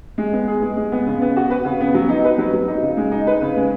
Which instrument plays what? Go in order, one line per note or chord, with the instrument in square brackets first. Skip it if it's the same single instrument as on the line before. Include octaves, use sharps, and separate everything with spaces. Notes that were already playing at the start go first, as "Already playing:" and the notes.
[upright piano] G#3
B3
G#4
G#3
G#3
B3
C#3
B3
F#4
B4
C#3
B3
F#3
D#4
B4
F#3
F#3
D#4
C#3
G#3
D#4
B4
C#3
G#3